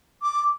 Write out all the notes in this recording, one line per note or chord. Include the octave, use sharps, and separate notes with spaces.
D6